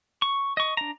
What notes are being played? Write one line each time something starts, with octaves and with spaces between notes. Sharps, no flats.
C#6
D#5 C#6
D4 A#5